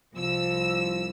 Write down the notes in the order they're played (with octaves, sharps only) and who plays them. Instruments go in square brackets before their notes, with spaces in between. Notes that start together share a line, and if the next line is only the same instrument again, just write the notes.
[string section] C2 E6 [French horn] F3